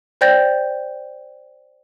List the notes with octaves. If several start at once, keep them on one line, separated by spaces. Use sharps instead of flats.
C5 D5 G5 G6 A6 A#6